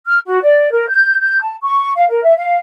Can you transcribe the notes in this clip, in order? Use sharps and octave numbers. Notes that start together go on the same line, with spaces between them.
F6
F#4
D5
A#4
G6
G6
A5
C#6
F5
A#4
E5
F5